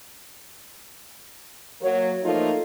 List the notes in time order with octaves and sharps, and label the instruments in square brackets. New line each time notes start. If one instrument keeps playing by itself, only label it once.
[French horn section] F#3 A#3 C#5
F3 A3 A#3 D#4 F4 A4